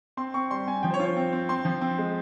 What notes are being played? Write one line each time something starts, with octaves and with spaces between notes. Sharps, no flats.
C4 C6
C4 C#6
G3 C6
C4 G#5
F3 G5
C5
C#5
F4
C#5
C4
C4
C4 C6
F3
C4
G#3